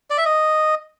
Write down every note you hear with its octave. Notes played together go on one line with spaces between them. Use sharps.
D5
E5
D#5